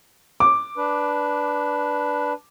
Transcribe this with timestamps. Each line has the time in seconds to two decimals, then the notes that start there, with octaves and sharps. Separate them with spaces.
0.40 D6
0.77 D4 B4